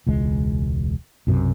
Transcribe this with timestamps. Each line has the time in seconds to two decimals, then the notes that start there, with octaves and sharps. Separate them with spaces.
0.07 E1 C#2 G#3
1.27 B1 F#2 C3